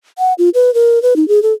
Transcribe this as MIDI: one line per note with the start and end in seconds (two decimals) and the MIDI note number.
0.19 0.33 78
0.38 0.49 65
0.54 0.73 71
0.74 1.02 70
1.02 1.16 71
1.16 1.27 63
1.28 1.42 68
1.43 1.53 69